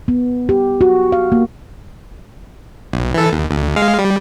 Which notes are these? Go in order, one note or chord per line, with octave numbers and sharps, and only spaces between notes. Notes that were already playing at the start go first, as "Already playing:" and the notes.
B3
G4
F#4
F5
A#3
B1
E3 A4
D#2
D2
G#3 F5
G3